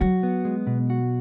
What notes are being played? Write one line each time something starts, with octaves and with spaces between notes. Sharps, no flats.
F#3 F#4
B3
G#3
B2
F#4